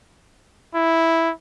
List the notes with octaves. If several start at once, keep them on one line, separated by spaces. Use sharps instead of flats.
E4